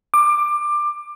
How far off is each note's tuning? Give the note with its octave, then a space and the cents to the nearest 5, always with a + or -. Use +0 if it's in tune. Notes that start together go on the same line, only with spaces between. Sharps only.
D6 +20